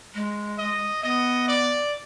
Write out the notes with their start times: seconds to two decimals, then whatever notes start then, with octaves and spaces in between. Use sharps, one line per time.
0.14 G#3
0.58 D#5
1.03 B3 D#5
1.48 D5